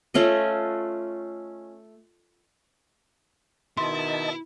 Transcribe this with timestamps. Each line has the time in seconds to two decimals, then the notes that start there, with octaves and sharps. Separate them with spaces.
0.14 A3 C#4 F4 D#5
3.77 B2 D#3 E4 D#5 A5 C6